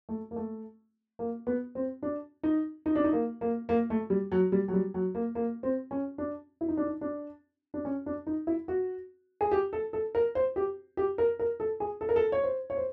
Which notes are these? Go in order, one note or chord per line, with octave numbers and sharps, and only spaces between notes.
A3
A#3
A3
A#3
B3
C4
D4
D#4
D#4
D4
D#4
A#3
A#3
A#3
A3
G3
F#3
G3
F#3
G3
F#3
A#3
A#3
C4
C#4
D4
E4
D#4
D4
D#4
D4
D4
C#4
D4
D#4
E4
F#4
G#4
G4
A4
A4
A#4
C5
G4
G4
A#4
A#4
A4
G#4
A4
A#4
A4
C#5
C5
C#5
C5